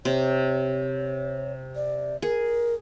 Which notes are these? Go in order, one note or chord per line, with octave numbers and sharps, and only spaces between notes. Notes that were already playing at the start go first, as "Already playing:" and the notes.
C3 C#5
D5
G#4 A#4